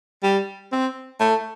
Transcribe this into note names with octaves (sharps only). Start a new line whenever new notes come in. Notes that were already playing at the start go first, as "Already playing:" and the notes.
G3
C4
A3